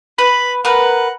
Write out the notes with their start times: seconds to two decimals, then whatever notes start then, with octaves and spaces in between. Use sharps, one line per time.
0.18 B4 B5
0.65 A#4 B4 F#5